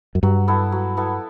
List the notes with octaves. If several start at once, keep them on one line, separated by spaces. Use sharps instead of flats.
F#2
G2 F#3
B3 E4 A4
F#3
B3 E4 A4